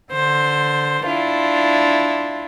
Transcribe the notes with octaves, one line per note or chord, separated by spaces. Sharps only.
D3 C5
D4 E4 F4